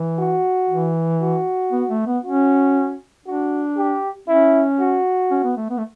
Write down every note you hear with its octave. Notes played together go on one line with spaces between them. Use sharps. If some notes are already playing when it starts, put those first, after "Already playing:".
Already playing: E3
F#4
E3
F#4
B3
A3
B3
C#4 F#4
D4 F#4
G4
C#4 E4
F#4
C#4
B3
A3
B3
A3